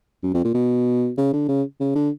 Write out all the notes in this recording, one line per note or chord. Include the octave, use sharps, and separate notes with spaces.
F#2
F2
A#2
B2
C#3
D3
C#3
C#3
D3